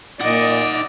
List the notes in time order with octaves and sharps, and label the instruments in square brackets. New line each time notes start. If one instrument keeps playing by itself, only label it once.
[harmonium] A#2 [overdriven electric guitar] D#4 F#5 [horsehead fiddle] D5 D#5